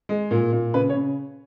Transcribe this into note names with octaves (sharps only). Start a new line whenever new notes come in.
G#3
A#2
A#2
C#3 B4
C#5
C#3